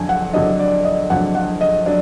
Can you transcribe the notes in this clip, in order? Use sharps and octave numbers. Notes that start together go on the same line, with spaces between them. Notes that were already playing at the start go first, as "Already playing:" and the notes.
Already playing: F2 D3 F#3 D4 G#5
F#5
F2 D3 F#3 D4 D#5
D5
D#5
F2 D3 F#3 D4 F#5
F#5
D#5
F#3 D4 D5